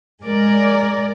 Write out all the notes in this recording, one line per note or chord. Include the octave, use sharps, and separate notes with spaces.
G#3 A#4 D5